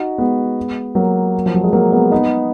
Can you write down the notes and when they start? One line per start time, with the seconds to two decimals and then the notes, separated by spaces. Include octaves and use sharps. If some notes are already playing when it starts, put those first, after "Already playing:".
Already playing: D#4 F#4
0.18 G#3 B3
0.95 F#3 A#3
1.46 F3
1.55 F#3
1.64 G#3
1.73 F#3 A#3
1.92 G#3 B3
2.12 B3 D#4